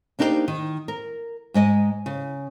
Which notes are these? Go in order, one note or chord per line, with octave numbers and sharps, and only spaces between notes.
A#3 D4 D#4 G4 A4 C5
D#3
A#4
G#2 G#3 D#5 G#5
C#3